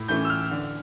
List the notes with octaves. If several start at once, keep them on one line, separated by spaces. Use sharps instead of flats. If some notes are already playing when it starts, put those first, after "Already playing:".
Already playing: A2
E3 A3 C#4 G6
E6
F6
D3